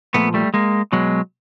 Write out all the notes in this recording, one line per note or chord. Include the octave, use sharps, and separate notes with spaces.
A#2 F3 A3 B3
G3 A3
G#3 A#3
B2 F#3 G#3